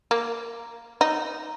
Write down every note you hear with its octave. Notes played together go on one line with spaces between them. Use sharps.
A#3
D#4